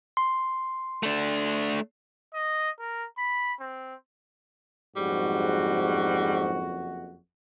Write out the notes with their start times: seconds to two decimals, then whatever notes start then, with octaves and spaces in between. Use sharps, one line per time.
0.17 C6
1.03 A3 D4
2.34 D#5
2.79 A#4
3.18 B5
3.60 C4
4.96 F#1 F2 G#2 G3 F#4